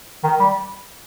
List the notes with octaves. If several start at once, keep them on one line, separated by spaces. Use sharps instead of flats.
D#3
G3